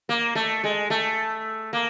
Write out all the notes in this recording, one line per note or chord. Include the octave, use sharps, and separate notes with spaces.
A#3
A3
G#3
A3
A#3